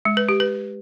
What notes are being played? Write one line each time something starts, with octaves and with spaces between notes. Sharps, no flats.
G#3
B4
G4
B4